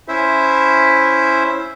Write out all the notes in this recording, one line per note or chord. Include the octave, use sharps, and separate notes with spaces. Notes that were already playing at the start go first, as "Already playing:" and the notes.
C#4 E4 C5 E5